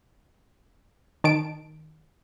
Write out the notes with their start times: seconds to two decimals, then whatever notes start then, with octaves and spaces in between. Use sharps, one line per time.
1.24 D#3 A5 D7